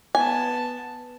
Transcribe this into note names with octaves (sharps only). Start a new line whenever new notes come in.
B3 G#5 A5